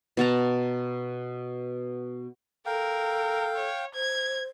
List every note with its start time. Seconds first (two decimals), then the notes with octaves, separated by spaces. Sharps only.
0.17 B2 F#5 A5 A#5
2.66 A4 A#4 F5 G5
3.55 C#5
3.94 C5 G#6